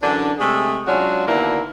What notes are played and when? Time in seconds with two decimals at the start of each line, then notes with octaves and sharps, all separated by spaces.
0.01 F#2 D3 E3 D4
0.39 C3 G#3 A3 G#4
0.86 F#3 G#3 C#4 D4 F4 F#4
1.27 D#2 B2 D3 A#3 E4